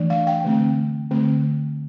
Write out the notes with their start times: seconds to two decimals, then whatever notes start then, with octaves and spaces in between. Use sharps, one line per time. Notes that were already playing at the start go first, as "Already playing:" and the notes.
Already playing: E3 A3 D4
0.10 F5
0.27 G5
0.44 D3 A3 C4
1.11 D3 A3 C4